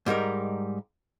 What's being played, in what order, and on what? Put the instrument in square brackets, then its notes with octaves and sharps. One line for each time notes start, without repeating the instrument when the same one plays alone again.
[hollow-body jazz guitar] G#2 G3 D#4 A#4